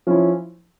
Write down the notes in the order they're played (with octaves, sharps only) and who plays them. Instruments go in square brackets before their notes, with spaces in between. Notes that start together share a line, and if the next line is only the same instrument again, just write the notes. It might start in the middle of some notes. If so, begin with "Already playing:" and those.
[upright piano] F3 C#4 E4